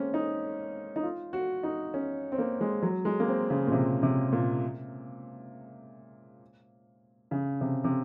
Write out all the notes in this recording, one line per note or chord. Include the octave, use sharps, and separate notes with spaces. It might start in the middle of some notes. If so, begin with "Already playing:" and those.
Already playing: G#3 A#3 C4 C#4
D#4
D#4
F4
F#4
D#4
C#4
C4
A#3
G#3
F#3
G#3
A#3
C4
C#3
A#2
C3
C3
A#2
C#3
C3
C3